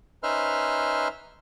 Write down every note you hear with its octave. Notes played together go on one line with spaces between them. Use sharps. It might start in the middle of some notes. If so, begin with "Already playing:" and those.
C#4 D#4 B4 C5 E5 F6